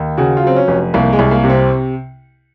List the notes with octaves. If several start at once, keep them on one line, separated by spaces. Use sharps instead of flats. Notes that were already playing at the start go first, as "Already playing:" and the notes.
Already playing: D#2
C#3 F#4
F4
F#3 C4
C#4
F1
C2 A#3
G#3
C2
A#3
C3
C4